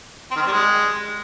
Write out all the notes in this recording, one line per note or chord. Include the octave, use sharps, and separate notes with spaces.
C4
D#3
C4
G3
G#3